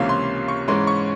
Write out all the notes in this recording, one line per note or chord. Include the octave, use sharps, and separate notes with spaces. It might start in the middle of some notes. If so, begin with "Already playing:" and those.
Already playing: C#2 C3 E3 A#3 C#4 F5
C6
C#6
G#2 E3 G#3 C#4 C6
C#6